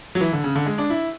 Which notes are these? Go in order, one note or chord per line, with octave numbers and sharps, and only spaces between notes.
F#3
E3
D3
C#3
D3
G#3
D4
E4